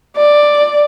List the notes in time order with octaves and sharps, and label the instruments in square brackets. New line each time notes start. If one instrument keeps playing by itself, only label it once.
[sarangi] D5